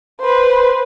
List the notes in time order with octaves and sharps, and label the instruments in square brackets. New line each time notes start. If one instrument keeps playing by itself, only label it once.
[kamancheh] B4 C5